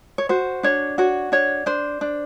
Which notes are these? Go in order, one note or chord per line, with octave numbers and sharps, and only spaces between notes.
C#5
F#4 C5
D4 C#5
F#4 C#5
D4 C#5
D4 C5
D4